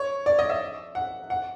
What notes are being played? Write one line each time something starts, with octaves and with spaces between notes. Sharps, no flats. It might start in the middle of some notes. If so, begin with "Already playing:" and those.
Already playing: C#5
D5
D#5
E5
F#5
F#5